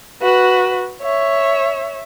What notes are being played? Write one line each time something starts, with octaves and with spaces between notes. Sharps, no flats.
F#4 B4
C#5 E5